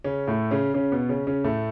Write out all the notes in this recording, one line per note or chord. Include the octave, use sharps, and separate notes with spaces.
C#3 C#4
A2 A3
C#3 C#4
C#3 C#4
B2 B3
C#3 C#4
C#3 C#4
A2 A3